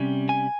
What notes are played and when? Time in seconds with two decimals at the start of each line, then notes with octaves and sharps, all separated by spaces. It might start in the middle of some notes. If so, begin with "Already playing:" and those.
Already playing: C3 G3 C#4
0.29 G#5